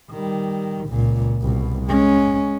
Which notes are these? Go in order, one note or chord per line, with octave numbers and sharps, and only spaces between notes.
D#3 G3
C#2 A#2
C2 B2
G#3 C#4